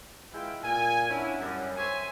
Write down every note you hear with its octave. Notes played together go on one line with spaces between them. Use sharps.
G#3 E4 F4 B4 G5
A#2 G#5
B3 C#4 D4 E4
F#2 G3
C5 C#5 E5 G#5